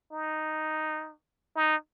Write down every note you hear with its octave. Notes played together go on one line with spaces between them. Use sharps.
D#4
D#4